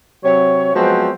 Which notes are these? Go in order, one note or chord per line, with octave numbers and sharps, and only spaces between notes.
C3 F#3 C4 C#5
F3 F#3 G#3 B3 C4 F#4